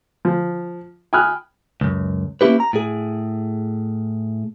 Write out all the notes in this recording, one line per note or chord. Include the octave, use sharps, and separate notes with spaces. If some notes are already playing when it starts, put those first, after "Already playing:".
F3
G5 G#5 B5 D#6 F6 F#6
C#2 F#2
A#3 C#4 E4 G4 B4
A#5
A2 G#4